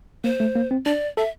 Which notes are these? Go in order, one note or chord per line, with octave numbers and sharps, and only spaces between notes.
A#3 C5
A3
A#3
C4
D4 D5
A4 E5